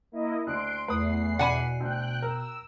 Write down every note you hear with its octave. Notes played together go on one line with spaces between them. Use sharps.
A#3 E4 D#5
D2 C6 F#6 D7
E2 A3 B4 D#6 C7
B2 D5 F#5 G#5 B5
D2 G5 F#6
A#4 E6